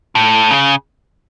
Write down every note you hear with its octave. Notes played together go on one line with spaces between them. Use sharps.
A2
C#3